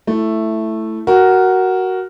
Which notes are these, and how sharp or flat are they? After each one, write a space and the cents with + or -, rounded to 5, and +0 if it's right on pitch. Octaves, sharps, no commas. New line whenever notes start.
A3 +0 E4 +5
F#4 +10 A#4 +0